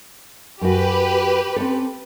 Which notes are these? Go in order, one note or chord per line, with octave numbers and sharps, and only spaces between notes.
F#2 F#4 G4 B4
C4 C#4 A4